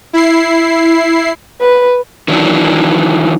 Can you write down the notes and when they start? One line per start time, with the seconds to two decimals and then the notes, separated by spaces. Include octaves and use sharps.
0.13 E4 C7
1.61 B4
2.28 D#3 E3 F#3 D4